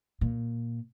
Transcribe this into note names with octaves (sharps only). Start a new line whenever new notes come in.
A#2